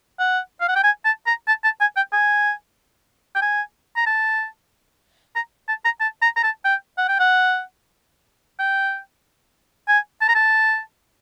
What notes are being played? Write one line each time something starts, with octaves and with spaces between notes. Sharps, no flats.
F#5
F5
F#5
G5
G#5
A5
A#5
A5
A5
G#5
G5
G#5
G5
G#5
A#5
A5
A#5
A5
A#5
A5
A#5
A#5
A5
G5
F#5
G5
F#5
G5
G#5
A5
A#5
A5